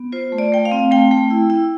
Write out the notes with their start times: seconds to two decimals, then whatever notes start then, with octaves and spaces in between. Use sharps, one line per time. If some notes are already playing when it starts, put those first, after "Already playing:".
Already playing: B3
0.12 F4 C5
0.32 A3
0.38 D5
0.52 A3 G5
0.65 F5
0.71 C4
0.91 A3 G5
1.11 A3
1.30 E4
1.50 E4